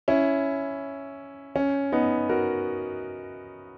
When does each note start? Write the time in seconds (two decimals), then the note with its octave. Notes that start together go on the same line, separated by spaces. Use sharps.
0.08 C#4 E4
1.56 C#4
1.92 B3 D#4
2.29 F#4 A#4